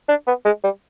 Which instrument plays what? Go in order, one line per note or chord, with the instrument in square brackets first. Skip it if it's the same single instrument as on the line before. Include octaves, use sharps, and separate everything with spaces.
[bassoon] D4
B3
G#3
G3